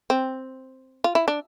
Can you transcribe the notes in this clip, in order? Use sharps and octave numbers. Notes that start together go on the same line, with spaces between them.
C4
F4
E4
D4